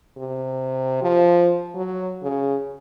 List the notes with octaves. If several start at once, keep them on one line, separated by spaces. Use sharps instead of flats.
C3
F3
F#3
C#3